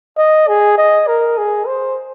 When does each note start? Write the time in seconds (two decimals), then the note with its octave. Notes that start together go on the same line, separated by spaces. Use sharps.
0.17 D#5
0.48 G#4
0.77 D#5
1.07 A#4
1.37 G#4
1.66 C5